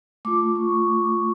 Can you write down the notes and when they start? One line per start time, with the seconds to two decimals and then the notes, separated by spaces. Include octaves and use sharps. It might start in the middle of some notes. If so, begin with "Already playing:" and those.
0.25 A3 F4 D6
0.55 C#6